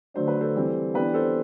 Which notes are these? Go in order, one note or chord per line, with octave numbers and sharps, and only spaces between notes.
D3 F#3 A3 D4 C5
B4
A4 C5
E3 G3 C4
E3 B3 D4 G4 B4
A4 C5